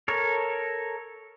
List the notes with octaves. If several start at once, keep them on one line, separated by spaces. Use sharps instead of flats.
A4 A#4 C#5